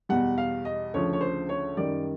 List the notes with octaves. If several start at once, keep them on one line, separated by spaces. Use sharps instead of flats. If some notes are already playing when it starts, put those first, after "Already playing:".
E2 B2 G3 F#5
F5
D#5
D2 C#3 F3 C#5
C#5
C5
C#5
F#2 D#3 G3 D5